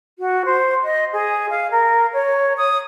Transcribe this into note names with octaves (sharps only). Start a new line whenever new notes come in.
F#4
C5
D#5
G#4
F5
A#4
C#5
D#6